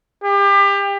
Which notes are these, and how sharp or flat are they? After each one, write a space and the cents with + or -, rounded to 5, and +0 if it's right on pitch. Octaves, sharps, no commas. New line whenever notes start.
G4 +30